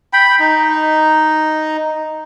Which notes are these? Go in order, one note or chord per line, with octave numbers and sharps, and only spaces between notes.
G5 B5
D#4